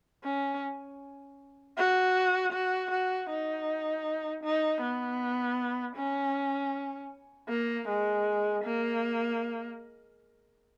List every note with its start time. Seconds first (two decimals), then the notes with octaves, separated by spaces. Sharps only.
0.24 C#4
1.77 F#4
2.53 F#4
2.91 F#4
3.30 D#4
4.44 D#4
4.82 B3
5.96 C#4
7.49 A#3
7.88 G#3
8.64 A#3